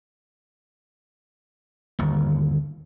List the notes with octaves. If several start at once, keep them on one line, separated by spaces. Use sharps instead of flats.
G1 D#2